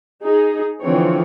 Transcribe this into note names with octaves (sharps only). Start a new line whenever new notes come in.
D#4 G#4
D3 E3 F3 C4 C#5